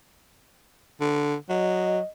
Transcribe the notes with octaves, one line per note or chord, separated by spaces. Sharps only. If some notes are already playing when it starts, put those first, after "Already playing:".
D3
F#3 D#5